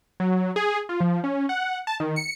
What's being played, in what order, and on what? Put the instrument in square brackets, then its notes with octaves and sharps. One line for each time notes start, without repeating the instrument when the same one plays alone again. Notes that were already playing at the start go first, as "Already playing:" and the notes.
[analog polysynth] F#3
G#4
F4
F3
C#4
F#5
A5
D#3
C#7